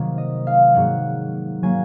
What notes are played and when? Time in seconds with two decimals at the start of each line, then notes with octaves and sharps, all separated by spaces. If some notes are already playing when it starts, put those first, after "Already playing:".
Already playing: C3 D#3 F#3 A#3
0.18 D#5
0.47 F5
0.75 G#2 F#3 A#3 F#5
1.63 F#3 A#3 G#5